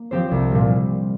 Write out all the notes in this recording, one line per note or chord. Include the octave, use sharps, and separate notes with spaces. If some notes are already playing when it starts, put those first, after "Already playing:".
Already playing: A#3
F3 C4 G4 C5
C2
A#2 G3